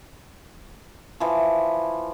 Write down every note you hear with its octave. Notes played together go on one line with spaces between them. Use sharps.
E3 F3